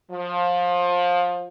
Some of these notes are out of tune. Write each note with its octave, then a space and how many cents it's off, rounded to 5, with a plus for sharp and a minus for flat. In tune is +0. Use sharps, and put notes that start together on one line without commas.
F3 +20